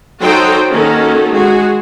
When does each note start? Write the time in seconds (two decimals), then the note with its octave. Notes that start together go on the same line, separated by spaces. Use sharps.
0.21 F#3 D#4 F#4 A4 C5 G5
0.71 D#3 A#3 C#4 F#4 A4
1.33 G#3 F#4 G#4